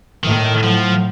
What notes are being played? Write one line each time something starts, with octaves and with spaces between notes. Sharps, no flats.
A2 D#3
F3 F#3